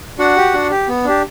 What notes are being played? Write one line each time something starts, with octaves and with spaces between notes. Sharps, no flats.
D4 F#4 F#5
G4
D4
G4
B3
D4 G4